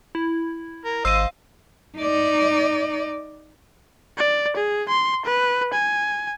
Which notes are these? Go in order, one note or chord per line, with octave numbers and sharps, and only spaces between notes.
E4
A#4
G#1 C5 D#5 F5 E6 D#7
D#4 D5
D5
G#4
C6
B4
G#5